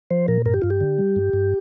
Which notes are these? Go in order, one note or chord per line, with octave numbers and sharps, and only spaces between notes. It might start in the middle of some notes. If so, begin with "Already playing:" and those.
F3 C5
A#2 A#4
G2 A#4
G4
G2 F4
G4
D3
G3
G2
G2